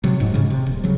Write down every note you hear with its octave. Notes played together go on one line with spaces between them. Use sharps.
C3 F#3
D#1 G#2
G#2 C#3
C3
D#1
C#3 F#3